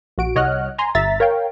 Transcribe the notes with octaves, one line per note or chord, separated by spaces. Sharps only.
A#1 F#4 D7
C2 C#5 D#5 F#5 F6 F#6
G#5 A#5 C6
G1 E5 A#5 A6 B6
A#4 C#5 F5 G5